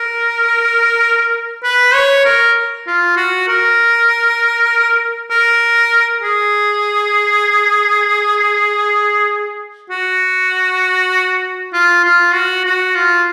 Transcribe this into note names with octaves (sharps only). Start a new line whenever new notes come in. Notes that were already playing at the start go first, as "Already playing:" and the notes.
Already playing: A#4
B4
C#5
A#4
F4
F#4
A#4
A#4
G#4
F#4
F4
F4
F#4
F#4
F4